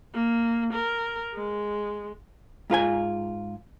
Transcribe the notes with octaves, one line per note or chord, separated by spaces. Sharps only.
A#3
A#4
G#3
G#2 F4 B4 G#5